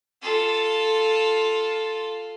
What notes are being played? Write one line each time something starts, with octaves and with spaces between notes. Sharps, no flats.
F4 A4